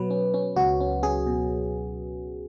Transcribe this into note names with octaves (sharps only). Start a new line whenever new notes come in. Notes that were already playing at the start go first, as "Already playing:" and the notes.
Already playing: B2 F#3 B4
C#4
C#4
C#2 F#4
C#4
C#4 G#4
B2